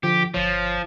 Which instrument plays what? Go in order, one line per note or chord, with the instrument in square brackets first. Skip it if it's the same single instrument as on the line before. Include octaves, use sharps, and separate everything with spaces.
[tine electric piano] D3 F3 F4 [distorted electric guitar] G4
[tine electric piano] G1 C#5 [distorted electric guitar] F3